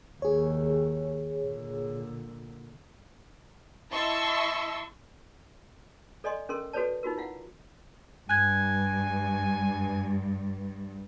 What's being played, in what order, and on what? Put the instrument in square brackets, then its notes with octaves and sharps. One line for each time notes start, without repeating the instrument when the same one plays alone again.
[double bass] D#2 [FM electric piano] G#4 C#5
[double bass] A#2 D3
[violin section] E4 D#5 A5 C6 C#6 E6
[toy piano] A4 D5 D#5 G#5 C6
C#4 A4 A#4 C6
F#4 A4 B4 C#5 D5 A5
D#4 F4 F#4 A#4
E4 F5 F#5
[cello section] G2 [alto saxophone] G#5 [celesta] F#6 G#6